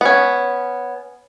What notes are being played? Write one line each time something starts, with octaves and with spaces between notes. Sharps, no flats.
B3 C#4